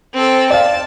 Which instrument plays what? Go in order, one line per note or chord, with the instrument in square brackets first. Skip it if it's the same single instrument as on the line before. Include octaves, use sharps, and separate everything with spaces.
[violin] C4 A4
[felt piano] D5 F5 [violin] A5